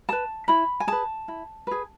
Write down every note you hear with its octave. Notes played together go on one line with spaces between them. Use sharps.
G#4 B4 A5
E4 B5
G#5
G#4 B4 A5
E4
G#4 B4